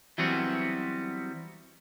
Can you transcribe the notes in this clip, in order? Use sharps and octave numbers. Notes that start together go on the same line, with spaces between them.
E3 F#3 G3 B3 C4 F#4